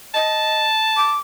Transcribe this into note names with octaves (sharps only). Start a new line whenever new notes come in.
D#5 A5
D6